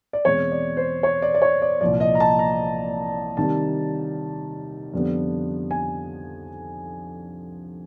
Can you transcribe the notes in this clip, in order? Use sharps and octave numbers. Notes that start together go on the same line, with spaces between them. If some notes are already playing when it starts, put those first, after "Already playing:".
D5
E2 B2 G#3 C4 C#5
D5
C5
C#5
D5
D5
C#5
D5
C2 A#2 F3 D5
D#5
A#5
A5
A#5
C3 D#3 G3 A5
F2 D3 G3 B3
G#5